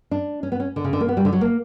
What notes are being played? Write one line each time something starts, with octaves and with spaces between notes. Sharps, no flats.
D4
C#4
B3
C#4
D3
C#3
D3
A#3
B3
G3
D3
F#3
A#3